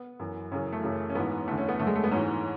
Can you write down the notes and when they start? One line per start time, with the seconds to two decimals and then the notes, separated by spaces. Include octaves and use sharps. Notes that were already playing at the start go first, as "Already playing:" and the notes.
Already playing: B3
0.19 F#2 E3
0.52 F#2 C#3 E3 C#4
0.72 A3
0.83 F#2 C#3 E3
1.10 C#4
1.15 G#2 E3 B3
1.48 E2 D3 A3
1.58 C#4
1.68 B3
1.79 F#2 D3 A3
1.87 G#3
1.95 A3
2.04 B3
2.11 G#2 E3 C#4